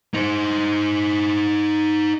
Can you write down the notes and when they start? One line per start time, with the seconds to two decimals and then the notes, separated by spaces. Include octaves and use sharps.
0.14 D#4 C5